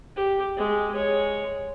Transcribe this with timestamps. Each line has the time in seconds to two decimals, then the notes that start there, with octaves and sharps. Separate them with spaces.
0.16 G4
0.56 G#3 G4
0.91 G#3 C#5